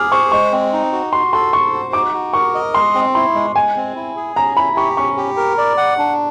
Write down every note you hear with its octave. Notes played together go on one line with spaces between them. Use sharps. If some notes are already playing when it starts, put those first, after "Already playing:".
Already playing: G#4 D6 F6
C5 C#6
G#3 C#6
C4
D#4
F#4
F#4 C6
A4 C6
C5 C#6
F#4
D#4 D6
F#4
A#4 C#6
D#5
G#3 C6
C4
E4 C6
G#3
G#3 G#5
C4
E4
G#4
C#4 A#5
E4 B5
G4 C#6
C#4 C#6
G4
A#4
D5
F#5
D4